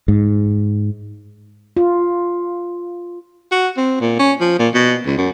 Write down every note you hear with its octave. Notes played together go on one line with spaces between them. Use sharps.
G#2
F4
F#4
C4
A#2
C#4
F3
A#2
B2
C#2
F#2